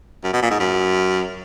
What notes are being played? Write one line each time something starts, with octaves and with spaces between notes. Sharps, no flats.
F#2
B2
A#2
G#2
F#2